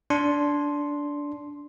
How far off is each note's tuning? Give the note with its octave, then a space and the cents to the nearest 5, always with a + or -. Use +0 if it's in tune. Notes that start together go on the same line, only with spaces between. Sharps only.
D4 -15 C6 +0